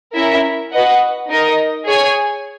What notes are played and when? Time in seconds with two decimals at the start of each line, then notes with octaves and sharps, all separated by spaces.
0.15 C#4 E4 A#4 E5
0.72 F#4 B4 D#5 F#5
1.30 D#4 A#4 D#5
1.86 G#4 C#5 G#5